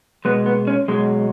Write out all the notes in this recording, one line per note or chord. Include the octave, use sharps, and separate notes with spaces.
B2 G#3 B3
B3
C#4
B2 F#3 G#3